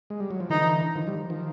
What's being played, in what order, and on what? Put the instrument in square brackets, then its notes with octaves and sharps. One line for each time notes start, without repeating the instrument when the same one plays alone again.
[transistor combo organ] G#3
G3
F#3
F3
[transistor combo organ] D3 E3 [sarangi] D#4
[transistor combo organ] D#3 F3
F3 G3
D#3 F3